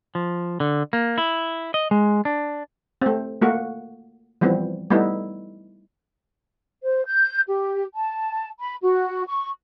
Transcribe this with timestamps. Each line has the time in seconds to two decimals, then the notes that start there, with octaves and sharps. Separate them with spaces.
0.15 F3
0.60 D3
0.93 A#3
1.18 E4
1.74 D#5
1.91 G#3
2.25 D4
3.02 A3 C4
3.42 A3 A#3 F#4
4.41 E3 F3 G3 B3 C4
4.90 G3 A3 B3 D#4 E4
6.83 C5
7.06 G6
7.47 G4
7.95 A5
8.60 B5
8.81 F#4
9.27 C#6